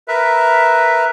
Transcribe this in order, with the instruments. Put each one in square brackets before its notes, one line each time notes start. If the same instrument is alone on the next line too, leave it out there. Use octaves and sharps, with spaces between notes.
[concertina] A#4 B4 E5